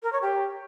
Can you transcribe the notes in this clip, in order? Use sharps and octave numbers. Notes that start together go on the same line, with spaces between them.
A#4
C#5
G4